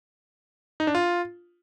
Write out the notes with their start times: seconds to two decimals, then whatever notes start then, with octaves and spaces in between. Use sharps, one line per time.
0.80 D#4
0.87 D4
0.95 F4